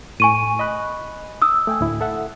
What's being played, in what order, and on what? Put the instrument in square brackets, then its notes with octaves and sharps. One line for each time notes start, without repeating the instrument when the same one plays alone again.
[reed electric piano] A2 [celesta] G#5 C#6 D#7
[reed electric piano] D#5 B5 F#6
[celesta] D#6 E6
[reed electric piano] A3 G5 G#5
D2 A2 E4
A4 E5 F#5